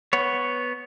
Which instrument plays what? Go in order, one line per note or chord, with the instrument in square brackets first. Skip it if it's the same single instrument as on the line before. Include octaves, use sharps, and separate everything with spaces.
[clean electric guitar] B3 C#5